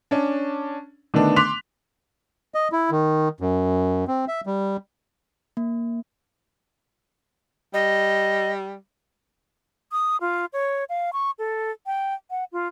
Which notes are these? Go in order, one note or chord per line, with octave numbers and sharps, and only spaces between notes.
C#4 D4
D3 D#3 A3 B3 D4
C6 D6 F#6 B6 F7
D#5
E4
D#3
F#2
C4
E5
G3
A#3
G3 D#5
D#6
F4
C#5
F5
C#6
A4
G5
F#5
F4